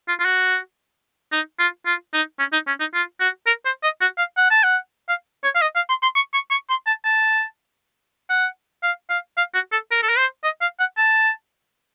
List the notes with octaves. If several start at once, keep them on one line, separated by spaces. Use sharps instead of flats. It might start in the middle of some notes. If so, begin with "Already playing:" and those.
F4
F4
F#4
D#4
F4
F4
D#4
C#4
D#4
C#4
D#4
F4
F#4
A#4
C5
D#5
F#4
F5
F#5
A5
F#5
F5
C#5
F5
D#5
F5
C6
C6
C#6
C#6
C#6
C6
A5
A5
F#5
F5
F5
F5
F#4
A4
A#4
A4
A#4
C5
D#5
F5
F#5
A5